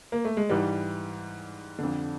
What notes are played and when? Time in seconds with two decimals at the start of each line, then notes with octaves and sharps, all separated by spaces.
0.12 A#3
0.25 A3
0.37 G#3
0.49 G#2 E3 G3
1.79 F2 D3